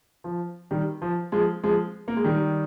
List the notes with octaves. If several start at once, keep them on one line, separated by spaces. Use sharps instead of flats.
F3
D#3 G3
F3
F3 G#3
F3 G#3
A#3
G#3
D#3 G3